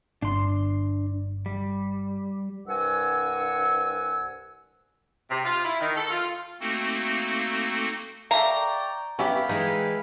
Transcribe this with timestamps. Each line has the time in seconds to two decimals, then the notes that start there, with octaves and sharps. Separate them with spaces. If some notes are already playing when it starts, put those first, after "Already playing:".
0.22 G1 D4 C6
1.46 G3
2.67 C2 G2 F#5 G#5 E6
5.30 C3
5.45 F4
5.64 E4
5.80 D#3
5.96 A4
6.11 F4
6.60 A3 A#3 C4 D#4 F#4 A4
8.31 A4 D5 E5 F5 G5 A#5 C#6
9.19 B3 C#4 E4 G4 F5 G5 B5
9.49 E3 G#3 D#4